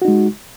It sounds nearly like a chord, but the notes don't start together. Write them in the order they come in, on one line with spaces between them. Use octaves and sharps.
F#4 D#4 G#3